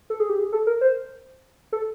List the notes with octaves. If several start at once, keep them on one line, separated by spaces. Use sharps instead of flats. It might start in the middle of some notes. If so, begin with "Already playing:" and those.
A4
G#4
G4
G#4
A4
A#4
C5
A4